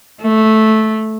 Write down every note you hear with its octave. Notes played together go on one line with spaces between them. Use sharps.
A3